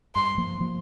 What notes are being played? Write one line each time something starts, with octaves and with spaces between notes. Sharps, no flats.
G2 C6
F3 A#3
F3 A#3